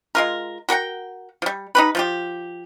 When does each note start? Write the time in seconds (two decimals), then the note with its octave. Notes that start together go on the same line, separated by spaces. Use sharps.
0.15 G#3 F4 A#4
0.69 F#4 A#4 F#5 G5
1.42 F3 G3
1.75 D#4 G4 B4
1.95 F3 F4 G4